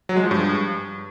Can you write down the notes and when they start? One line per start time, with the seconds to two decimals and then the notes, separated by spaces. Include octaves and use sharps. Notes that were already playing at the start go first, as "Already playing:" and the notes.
0.09 F#3
0.16 G#3
0.24 F3
0.31 G2